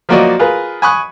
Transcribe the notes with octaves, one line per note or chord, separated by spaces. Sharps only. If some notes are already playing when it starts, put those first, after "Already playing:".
F3 F#3 A#3 F#4 D5 D#5
F4 G#4 A#4 B4
G#5 B5 C#6 D#6 F#6